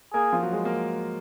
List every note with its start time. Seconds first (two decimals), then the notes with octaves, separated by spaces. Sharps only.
0.13 A#3 G#4 A#4
0.33 F3 F4
0.43 F#3 F#4
0.53 G#3 G#4
0.65 A#3 A#4